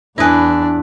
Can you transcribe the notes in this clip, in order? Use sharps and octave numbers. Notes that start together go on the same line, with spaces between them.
E2 D4 E4 B4 G#5 D#6 A#6